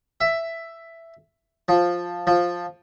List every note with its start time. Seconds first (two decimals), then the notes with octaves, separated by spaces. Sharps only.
0.21 E5
1.68 F3
2.27 F3